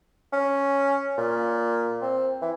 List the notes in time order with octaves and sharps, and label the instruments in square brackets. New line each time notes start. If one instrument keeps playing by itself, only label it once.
[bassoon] C#4
A#2
C4
E3